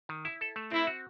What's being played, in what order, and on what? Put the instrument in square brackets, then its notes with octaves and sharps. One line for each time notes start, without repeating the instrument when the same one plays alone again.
[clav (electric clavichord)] D#3
E4
A4
A3
[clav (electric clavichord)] C4 [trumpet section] E4
[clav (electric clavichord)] F#4